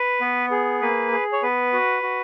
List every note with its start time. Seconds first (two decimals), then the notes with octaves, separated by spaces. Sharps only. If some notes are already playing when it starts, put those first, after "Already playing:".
Already playing: B4
0.21 B3
0.51 G#4
0.81 A#3 B4
1.12 G#4
1.33 C#5
1.42 B3 B4
1.73 F#4
2.03 F#4